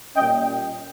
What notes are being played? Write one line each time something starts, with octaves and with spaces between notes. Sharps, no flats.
A#2 G3 C#4 D#5 G5